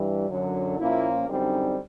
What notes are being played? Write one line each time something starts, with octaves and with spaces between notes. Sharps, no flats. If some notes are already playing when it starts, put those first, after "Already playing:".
Already playing: G2 E3 G3
F#2 D3 F#3
A#2 F3 A#3 C#4 E4
F#2 D3 G3 C4 D#4